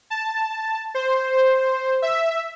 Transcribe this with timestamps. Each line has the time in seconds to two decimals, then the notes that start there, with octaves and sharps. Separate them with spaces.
0.10 A5
0.94 C5
2.02 E5